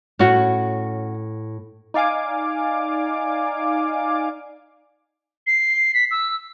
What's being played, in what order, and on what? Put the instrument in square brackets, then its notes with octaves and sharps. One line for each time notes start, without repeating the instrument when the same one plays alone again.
[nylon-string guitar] A2 [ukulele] C#4 F#4
[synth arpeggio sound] D#4 D5 F5 G#5 D6
[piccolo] C7
B6
E6